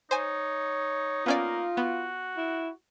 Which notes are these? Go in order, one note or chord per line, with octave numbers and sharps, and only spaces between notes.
D#4 C5 C#5 G#5
A#3 B3 C#4 F4 D5
B3 F#4
E4